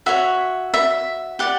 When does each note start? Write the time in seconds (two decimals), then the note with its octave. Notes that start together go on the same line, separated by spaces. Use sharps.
0.06 F#4 C#5 E5
0.74 E5
1.39 G4 D5 F#5